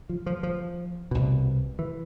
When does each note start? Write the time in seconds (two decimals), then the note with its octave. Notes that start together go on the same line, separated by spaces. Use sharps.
0.09 F3
0.26 F3
0.43 F3
1.11 C2 B2
1.79 E3